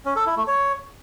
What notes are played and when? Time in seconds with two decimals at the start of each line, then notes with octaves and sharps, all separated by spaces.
0.05 C#4
0.16 A4
0.26 E4
0.37 A3
0.47 C#5